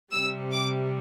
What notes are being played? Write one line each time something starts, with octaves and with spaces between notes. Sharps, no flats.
C3 G3 E6
D6